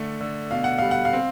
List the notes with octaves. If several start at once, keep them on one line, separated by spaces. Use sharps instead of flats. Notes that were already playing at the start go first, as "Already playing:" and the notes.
Already playing: D3 A3
D3
B2 F5
F#5
G3 F5
F#5
F5
C4